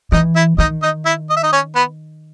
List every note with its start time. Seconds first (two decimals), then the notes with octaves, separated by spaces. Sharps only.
0.12 E3 D#4 D#5
0.36 E4 E5
0.58 D#3 D#4 D#5
0.82 D#4 D#5
1.06 E4 E5
1.30 D#5
1.37 E5
1.43 D#4 D#5
1.52 C#4 C#5
1.75 B3 B4